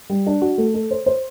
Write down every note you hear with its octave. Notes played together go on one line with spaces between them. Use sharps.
G3
D4
F#4
A3
A4
C5
C5